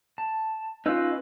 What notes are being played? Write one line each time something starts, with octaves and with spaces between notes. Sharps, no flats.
A5
C#4 D#4 F4 B4 E6